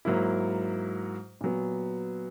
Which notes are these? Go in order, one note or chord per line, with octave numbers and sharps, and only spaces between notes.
G#2 F#3 A#3 E4
A#2 F#3 B3